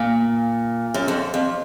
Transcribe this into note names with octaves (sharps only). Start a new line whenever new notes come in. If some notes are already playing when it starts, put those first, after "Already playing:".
Already playing: A#2
F#2
F2
F2